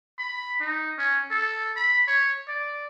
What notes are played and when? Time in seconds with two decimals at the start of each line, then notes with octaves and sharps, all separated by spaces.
0.19 B5
0.61 D#4
0.98 C#4
1.31 A4
1.76 B5
2.07 C#5
2.48 D5